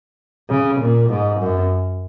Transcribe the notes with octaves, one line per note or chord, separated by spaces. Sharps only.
C#3
A#2
G#2
F#2